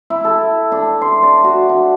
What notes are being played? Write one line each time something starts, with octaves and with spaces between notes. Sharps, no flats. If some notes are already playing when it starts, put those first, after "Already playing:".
E4
A4
D4
C6
D5
F#4
D4